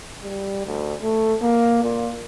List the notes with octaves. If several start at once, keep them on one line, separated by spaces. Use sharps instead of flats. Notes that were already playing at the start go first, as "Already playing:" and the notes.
G3
D2
A3
A#3
A#2